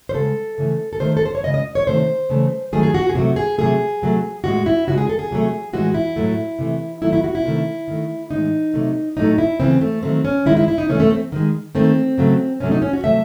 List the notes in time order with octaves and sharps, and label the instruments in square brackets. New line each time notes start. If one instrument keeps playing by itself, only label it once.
[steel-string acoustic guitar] C5
C#3 G#3 A4
C#3 E3 A3
A4
D#3 A3 C5
A4
C5
C#5
C#3 G#3 D#5
D#5
C#5
C3 D#3 A3 C5
C#3 E3 A3
D#3 F#3 A3 G#4
G#4
F#4
G#4
C3 F#3 A3 F#4
G#4
C3 F#3 A3 G#4
C3 F#3 A3
A2 G#3 F#4
E4
C#3 G#3 F#4
G#4
A4
G#4
C3 F#3 A3
A2 E3 G#3 F#4
E4
A2 F#3 A3
C3 E3 A3
D#3 F#3 A3 E4
E4
F#4
E4
C3 D#3 A3
D#3 A3
A2 E3 G#3 D#4
C3 F#3 A3
A2 F#3 A3 D#4
E4
C#3 E3 A3 C4
A3
D#3 F#3 A3 C4
C#4
D#3 G#3 E4
E4
E4
D#4
C3 E3 A3 C#4
A3
C4
D#3 G#3
D#3 A3 C4
C#3 F#3 A3
C3 F#3 A3 C#4
D#4
C#4
F#4
C3 F#3 A3 E5